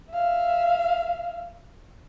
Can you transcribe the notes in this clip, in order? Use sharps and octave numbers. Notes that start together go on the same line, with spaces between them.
E5 F5